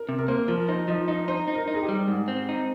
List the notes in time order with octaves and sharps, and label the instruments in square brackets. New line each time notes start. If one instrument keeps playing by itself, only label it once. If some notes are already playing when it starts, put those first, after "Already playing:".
Already playing: [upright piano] A#4
[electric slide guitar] C3
[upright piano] A#4
[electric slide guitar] A#3 [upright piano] C5
[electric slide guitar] F3 [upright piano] A#4
[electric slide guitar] D#4 [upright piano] C5
[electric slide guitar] F3 [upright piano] D#5
[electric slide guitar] D#4 [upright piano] D#5
[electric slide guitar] D#4 [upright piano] C5
[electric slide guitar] D#4
[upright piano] A#4
[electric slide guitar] D#4
[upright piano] G#4
G4
[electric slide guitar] G3
G#2
C4
D#4